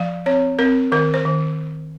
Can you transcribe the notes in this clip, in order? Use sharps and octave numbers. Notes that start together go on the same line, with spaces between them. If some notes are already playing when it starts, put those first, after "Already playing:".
Already playing: F3 F5
C4 C#5
C4 A#4
D#3 A#4
C5
D#3